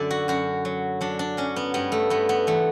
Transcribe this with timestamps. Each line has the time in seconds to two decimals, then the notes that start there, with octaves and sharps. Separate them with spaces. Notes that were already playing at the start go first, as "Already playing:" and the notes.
Already playing: F#2 D3 D5 E5
0.11 F#4
0.28 F#2 F#4
0.65 F#3
1.01 F#3 D4
1.19 D4
1.37 F#3 C#4
1.56 B3
1.74 G2 B3
1.92 A3
2.10 G2 B3
2.29 B3
2.47 E3 A3